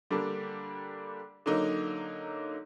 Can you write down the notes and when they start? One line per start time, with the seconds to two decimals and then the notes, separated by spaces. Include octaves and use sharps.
0.11 D3 G3 A#3 D4
1.46 D3 F#3 A#3 D#4